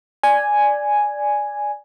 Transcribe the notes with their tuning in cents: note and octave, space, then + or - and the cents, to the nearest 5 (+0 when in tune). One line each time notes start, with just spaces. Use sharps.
D5 +0 G#5 +0